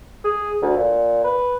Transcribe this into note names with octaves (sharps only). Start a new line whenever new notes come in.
G#4
D2
A#2
B4